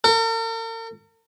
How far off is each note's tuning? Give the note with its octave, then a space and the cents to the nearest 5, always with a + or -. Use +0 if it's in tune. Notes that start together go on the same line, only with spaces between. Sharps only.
A#4 -45